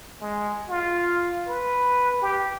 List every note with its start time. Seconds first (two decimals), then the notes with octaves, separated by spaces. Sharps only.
0.21 G#3
0.69 F4
1.48 B4
2.22 G4